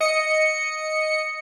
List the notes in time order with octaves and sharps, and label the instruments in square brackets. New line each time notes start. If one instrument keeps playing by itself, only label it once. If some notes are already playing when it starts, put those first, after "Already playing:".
[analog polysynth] D#5 C#7